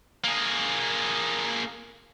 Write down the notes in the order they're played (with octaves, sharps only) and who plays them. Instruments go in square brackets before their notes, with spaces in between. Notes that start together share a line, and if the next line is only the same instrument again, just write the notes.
[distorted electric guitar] A#3 G#4